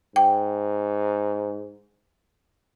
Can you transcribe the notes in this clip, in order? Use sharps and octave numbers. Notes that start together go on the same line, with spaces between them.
G#2 G5